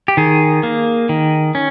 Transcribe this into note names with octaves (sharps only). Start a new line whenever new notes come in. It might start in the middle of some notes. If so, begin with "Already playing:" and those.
G4
D#3 G#4
A#3
D#3
C#4